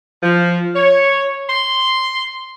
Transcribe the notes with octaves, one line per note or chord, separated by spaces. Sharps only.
F3
C#5
C6